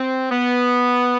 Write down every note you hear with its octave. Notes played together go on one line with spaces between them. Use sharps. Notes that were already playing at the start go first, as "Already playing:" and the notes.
Already playing: C4
B3